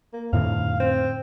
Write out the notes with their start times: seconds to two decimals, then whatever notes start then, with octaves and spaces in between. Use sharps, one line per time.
0.13 A#3
0.33 F2 A2 D3 F5
0.80 C4